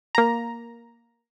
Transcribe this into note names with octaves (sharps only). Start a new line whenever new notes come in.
A#3 A#5